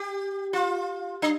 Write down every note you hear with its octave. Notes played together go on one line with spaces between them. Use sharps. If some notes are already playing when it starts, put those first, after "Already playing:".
Already playing: G4
F4
D4